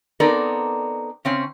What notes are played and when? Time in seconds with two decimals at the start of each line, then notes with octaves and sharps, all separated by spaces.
0.20 B3 C4 D#4 A4 A#4 D5
1.25 C#3 C4 C#4